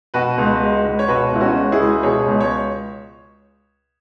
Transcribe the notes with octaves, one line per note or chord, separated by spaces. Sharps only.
B2 F#4 B4
C#2
G#3
C#2
C#5
B2 F#4 B4
C#2 E4
C#4 F#4
G#3
E4 G#4
C#2
B2 G#4 C#5
C#2
C#5